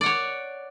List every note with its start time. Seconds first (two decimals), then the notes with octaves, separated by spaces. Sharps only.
0.01 D5
0.03 F#5
0.06 C#5